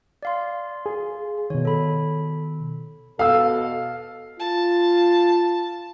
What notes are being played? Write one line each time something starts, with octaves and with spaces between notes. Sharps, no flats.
D5 F5 C6
G#4
B2 D#3 C#5
A4 B5
B2 A4 F5 E6
F4 A5